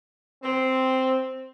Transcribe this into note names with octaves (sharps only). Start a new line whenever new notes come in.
C4